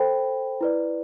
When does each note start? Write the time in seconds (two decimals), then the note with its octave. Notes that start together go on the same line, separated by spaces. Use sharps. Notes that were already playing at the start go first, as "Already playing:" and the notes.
Already playing: A4 C5 G5 B5
0.61 E4 B4 D5